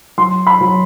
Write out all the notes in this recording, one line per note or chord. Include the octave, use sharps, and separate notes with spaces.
F#3 C6
B5
F#3